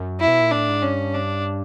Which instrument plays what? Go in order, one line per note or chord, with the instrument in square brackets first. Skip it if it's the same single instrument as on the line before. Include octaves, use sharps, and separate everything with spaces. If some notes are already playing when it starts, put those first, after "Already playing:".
Already playing: [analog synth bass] F#2
[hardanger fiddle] E4
[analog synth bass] B2
A#2
[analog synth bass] A2 [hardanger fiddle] D4
[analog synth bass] G#2
[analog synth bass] G2 [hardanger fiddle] C#4
[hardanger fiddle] D4